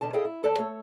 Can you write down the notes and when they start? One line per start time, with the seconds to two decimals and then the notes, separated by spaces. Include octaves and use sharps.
0.01 B2 D3 D#3 A5
0.13 E4 G#4 A4 D#5 F5 G5
0.25 E4
0.43 D2 A4 D5 A5
0.58 A3 A4 C#5